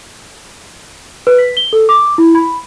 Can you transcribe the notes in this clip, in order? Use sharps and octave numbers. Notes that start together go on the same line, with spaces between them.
B4
B6
G7
A4
D6
E4
B5